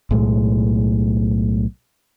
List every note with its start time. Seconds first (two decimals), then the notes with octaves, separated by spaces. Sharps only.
0.11 B1 A2 G#3